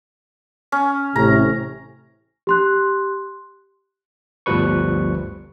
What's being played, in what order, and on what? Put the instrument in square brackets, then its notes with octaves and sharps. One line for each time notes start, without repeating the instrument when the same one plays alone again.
[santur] C#4
[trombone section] A1 A2 C3 [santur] A#5
[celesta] G4 C6 F#6
[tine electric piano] G1 D2 F3 G3 B4 C#6